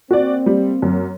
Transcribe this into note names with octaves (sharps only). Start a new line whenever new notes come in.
A#3 C4 F#4 D5
G3
F#2